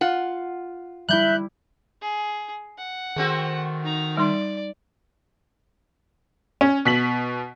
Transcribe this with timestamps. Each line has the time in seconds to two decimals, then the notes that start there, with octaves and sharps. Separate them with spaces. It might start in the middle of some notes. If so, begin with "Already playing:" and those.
0.01 F4 F#5
1.09 G3 E4 E5 F#6 G6
2.01 G#4
2.78 F#5
3.16 D#3 A3 C4 F#4 G#4
3.84 D#4 A#5
4.17 G3 D#4 D5 C6
6.61 C#4
6.85 B2 B6 F#7